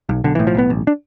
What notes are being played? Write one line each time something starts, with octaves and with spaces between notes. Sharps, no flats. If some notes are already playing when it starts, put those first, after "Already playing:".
B1
B1 D3
A2 E3
F3
B1 B3
A1
D4